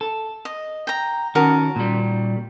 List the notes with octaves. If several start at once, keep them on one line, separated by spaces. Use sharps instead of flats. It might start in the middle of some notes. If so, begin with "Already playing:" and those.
A4
D#5
G5 A#5
D#3 C#4 F#4 A#4 A5
A#2 G3